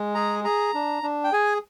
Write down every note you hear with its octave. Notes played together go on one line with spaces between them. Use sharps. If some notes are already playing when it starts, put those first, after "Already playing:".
Already playing: G#3
G#4 A#5
G#4 A#5
D4
D4
G5
G#4 G#5